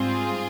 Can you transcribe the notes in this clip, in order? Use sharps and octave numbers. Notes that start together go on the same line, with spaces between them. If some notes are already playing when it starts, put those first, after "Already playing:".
Already playing: G#2 G3 C4 F4 G#4